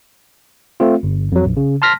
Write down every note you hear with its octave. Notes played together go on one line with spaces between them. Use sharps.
A3 C4 F4
G1
F2 F#3
A#1
C#3
A5 C6 F6 A#6 B6